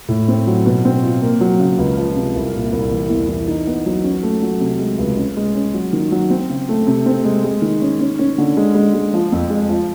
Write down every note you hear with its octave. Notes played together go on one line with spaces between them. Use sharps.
A2
C4
F#3
B2
C4
F4
A#3
F#3
C#3
C#2
F3
C3
C2
A#2
C2
E3
E2
E3
D#4
B3
F#3
C#4
A3
F#3
C3
G#3
C#2
C#4
G#3
C#4
F#3
D#3
F#3
C4
C#3
A3
C3
C4
G#3
G#3
D#3
C#4
C#4
C#4
D3
G#3
G#3
G#3
F3
F2
G#3
F3